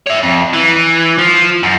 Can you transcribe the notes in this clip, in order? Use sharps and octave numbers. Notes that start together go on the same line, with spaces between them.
C#5 E5
F2
E3
F3
F#2